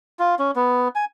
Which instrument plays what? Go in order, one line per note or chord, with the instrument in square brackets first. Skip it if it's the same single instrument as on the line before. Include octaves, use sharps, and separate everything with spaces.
[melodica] F4
C#4
B3
G#5